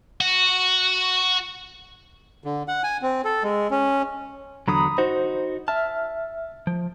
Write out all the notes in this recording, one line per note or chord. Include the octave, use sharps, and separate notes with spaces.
F#4
D3
F#5
G#5
C4
A4
G#3
C#4
E2 D3 F#3 A#5 B5 D#6
D#4 F#4 C5
E5 A5 F6
F3